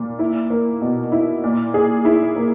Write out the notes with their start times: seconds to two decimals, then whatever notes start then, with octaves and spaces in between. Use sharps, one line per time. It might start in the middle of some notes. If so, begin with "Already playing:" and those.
Already playing: A#2
0.19 E4
0.50 A#3
0.82 B2
1.12 E4
1.44 A#2
1.74 G#4
2.05 E4
2.36 A#3